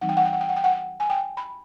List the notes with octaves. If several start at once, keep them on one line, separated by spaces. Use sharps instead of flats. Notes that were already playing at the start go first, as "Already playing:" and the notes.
E3 G3 C4 D#4 F#5
G5
F#5
G5
F#5
G5
F#5
G5
F#5
G#5
G5
B5